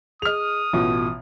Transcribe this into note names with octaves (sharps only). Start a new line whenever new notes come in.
G#4 D#5 D#6 F6 F7
A1 B2 F4